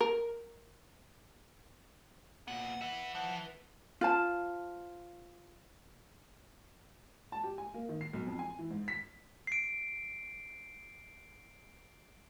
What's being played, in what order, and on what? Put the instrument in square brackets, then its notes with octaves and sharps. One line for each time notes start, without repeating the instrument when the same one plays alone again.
[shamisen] A#4
[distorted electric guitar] A#2 B3 [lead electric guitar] F#5
[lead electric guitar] B3 F#5 [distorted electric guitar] B4 E5
[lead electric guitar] F3 [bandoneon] F#5
[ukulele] F4 C5 A5
[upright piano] A5
G4
G#5
A#3
D#3
C7
B1
F2
G#5
E3
G#2
B6
[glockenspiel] C7 D7